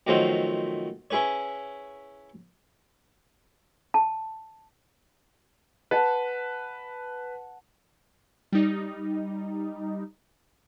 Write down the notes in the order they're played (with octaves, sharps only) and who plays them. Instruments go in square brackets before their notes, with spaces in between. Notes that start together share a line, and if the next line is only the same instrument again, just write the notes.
[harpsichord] B2 D#3 F3 F#3 A3 C4
C#4 E4 G#4 B4 C#5
[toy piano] A5
[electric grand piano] B4 [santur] F#5 A5
[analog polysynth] G3 D#4